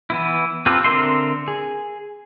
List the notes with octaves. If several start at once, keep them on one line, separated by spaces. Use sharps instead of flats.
E3 B3 E4
C4 F4 G4 A4 B4
D3 C4 A#4 E5 C6
G#4